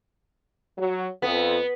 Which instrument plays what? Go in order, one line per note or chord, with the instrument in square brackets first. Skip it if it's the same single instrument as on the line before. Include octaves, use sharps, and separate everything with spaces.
[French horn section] F#3
[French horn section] F2 [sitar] B3